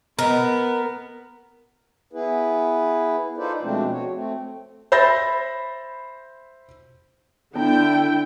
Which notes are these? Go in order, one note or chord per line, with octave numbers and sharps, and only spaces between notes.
B3 A#4 D#5 A#5
B3 E4 G#4 B4
D#4 F4 A4 B4 C5 D5
B2 F3 G#3 A3 C4 D4
F#4 C#5
A3 C4
C5 E5 B5 G6 A6 A#6
D3 B3 D4 E4 G5